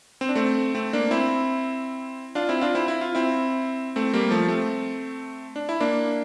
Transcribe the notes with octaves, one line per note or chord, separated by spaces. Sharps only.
C4
D4
A3 C4
A3 C4
A#3 D4
C4 E4
D4 F4
C4 E4
D4 F4
C4 E4
E4
F4
C4 E4
A3 C4
G3 A#3
F3 A3
A3 C4
D4
E4
A#3 D4